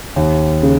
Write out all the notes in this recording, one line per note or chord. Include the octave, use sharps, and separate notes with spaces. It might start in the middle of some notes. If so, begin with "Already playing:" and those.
D#2
C#3